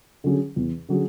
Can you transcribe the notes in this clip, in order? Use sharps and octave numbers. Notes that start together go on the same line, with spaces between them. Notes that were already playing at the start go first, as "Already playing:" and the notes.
D3 F#3 C#4 G#4
E2
D3 F#3 C#4 G#4